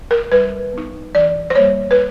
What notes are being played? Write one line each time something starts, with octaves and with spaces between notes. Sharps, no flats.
A#4
G3 B4
B3 D#4
E3 D5
C5
G3 A#3 C#5
B4